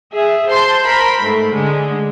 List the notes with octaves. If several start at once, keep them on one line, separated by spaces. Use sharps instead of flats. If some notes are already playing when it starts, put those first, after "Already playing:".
G#4 E5
C5 A5 C6 G6
A#4 C5 B5
G#2 A3
D3 G#3